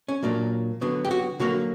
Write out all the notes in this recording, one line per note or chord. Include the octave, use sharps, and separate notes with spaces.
C#4
A#2 F#3 A#3 D4
D3 F#3 B3
G4
F#4
D3 F#3 A#3 F#4